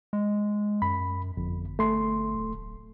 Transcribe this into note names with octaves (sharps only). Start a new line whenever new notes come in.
G#3
F#2 B5
G1 F2
A3 C6
D1